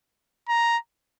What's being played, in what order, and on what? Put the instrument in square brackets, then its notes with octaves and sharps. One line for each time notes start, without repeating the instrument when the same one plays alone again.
[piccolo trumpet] A#5